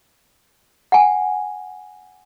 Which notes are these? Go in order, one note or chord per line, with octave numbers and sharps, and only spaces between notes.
F#5 G#5